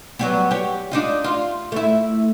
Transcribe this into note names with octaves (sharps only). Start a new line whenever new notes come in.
F#3 G3 B3
G4 C#5
D4 D#4 F4
F4
A3 E4